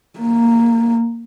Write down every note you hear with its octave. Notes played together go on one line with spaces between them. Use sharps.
A#3